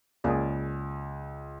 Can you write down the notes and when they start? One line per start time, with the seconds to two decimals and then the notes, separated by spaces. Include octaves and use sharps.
0.24 C#2 A#3 G#4 D5